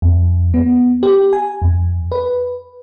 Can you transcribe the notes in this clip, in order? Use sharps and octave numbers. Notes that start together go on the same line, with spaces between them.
F2
B3
G4
G#5
F2
B4